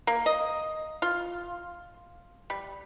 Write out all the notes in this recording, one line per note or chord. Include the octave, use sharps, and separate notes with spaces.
A#3
D#5
F4
G3